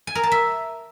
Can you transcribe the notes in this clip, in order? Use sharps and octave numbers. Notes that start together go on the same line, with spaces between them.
G#5
A#4
A5
E5